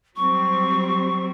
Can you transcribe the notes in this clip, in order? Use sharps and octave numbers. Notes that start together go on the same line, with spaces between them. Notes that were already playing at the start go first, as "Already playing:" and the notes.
F#3 G3 C4 C#6